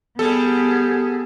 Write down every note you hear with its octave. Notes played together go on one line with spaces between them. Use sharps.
G3 B3 G#4 A4